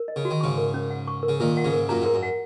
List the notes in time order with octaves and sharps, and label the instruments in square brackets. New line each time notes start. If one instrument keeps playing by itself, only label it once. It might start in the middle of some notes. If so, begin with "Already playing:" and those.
Already playing: [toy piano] A#4
D#5
[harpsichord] C#3
[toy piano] F#4
[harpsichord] D#3
[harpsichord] G#2 C#3 [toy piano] C#6
[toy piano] A#4
C#4
F#5
C#6
A#4
[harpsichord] C#3
[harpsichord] A#2 D#3 [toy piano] A#4
[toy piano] F#5
[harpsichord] G#2 C#3
[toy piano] A#4
[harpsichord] F#2 A#2 [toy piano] A#5
[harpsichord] G#2 [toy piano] A#4
[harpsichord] F#2
[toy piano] F#5